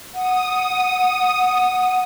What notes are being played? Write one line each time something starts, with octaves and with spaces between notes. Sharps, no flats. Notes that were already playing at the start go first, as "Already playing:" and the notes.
F#5 D#6